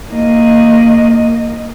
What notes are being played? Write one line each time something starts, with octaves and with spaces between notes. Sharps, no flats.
A#3 D#5